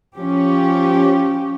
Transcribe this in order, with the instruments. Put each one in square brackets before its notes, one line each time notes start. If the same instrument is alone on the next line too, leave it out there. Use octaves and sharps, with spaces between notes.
[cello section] F3 C#4 G4